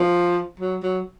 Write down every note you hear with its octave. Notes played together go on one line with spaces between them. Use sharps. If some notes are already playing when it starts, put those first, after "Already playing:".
Already playing: F3
F#3
F#3